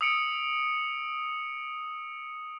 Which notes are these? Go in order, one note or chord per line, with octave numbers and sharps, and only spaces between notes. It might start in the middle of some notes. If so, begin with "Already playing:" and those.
D#6 E6 C#7 D7